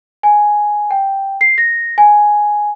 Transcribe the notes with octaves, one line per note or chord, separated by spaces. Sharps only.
G#5
G5
C7
A#6
G#5